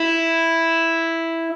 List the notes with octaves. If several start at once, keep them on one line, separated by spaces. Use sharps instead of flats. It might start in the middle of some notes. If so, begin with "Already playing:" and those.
Already playing: E4